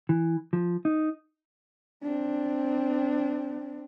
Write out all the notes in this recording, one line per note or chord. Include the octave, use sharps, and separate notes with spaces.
E3
F3
D#4
C4 D4